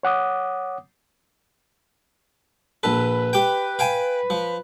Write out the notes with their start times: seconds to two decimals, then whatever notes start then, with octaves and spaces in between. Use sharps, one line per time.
0.03 C#5 F#5 D6 D#6
2.83 A#1 A4 B4
3.33 G4 G5
3.79 F5 G5 G#5
4.30 F3